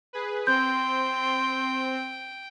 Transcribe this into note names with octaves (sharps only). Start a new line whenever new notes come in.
G#4 B4
C4 G5 C6 G6